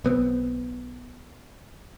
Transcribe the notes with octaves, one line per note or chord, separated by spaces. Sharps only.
B1 B3 C4